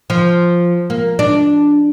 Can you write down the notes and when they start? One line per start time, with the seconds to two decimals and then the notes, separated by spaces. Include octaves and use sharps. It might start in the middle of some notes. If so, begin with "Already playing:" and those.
0.10 F3
0.90 A#3
1.19 D4